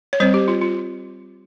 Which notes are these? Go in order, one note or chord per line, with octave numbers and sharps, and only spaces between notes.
C#5
G3 C4 C5
G4
F4
F4